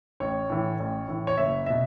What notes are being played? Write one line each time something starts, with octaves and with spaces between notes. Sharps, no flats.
A1 C#5
A2 E3
A1
A2 E3
C#5
F#1 E5
B2 E5